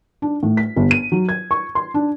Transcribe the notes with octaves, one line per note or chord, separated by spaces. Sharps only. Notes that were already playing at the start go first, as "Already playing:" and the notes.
D4
A2
B6
G1
D#7
F#3
G#6
C#6
C6
D4